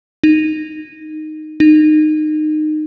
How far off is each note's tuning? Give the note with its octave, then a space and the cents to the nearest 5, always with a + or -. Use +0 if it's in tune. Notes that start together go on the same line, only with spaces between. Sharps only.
D#4 -10
D#4 -20